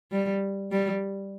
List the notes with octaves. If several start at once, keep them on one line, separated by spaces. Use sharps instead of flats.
G3
G3